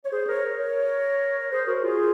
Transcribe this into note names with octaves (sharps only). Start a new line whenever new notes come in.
C#5
G#4 C5
A#4 C#5
A#4 C#5
C#5
G#4 C5
F#4 A#4
F4 G#4